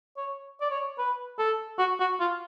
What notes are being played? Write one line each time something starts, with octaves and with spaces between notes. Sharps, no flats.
C#5
D5
C#5
B4
A4
F#4
F#4
F4